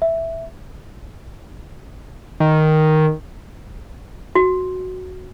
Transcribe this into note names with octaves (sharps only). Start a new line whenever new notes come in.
E5
D#3
F#4